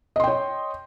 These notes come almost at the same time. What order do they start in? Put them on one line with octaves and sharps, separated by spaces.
D#5 C6 G5 C#5